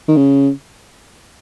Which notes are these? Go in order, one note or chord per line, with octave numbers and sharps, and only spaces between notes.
D#3
C#3